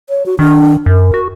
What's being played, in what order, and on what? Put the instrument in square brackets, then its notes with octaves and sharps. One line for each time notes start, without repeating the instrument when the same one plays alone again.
[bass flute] C#5
F#4
[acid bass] D#3 [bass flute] D4
[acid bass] F#2 [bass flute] A#4
[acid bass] F#4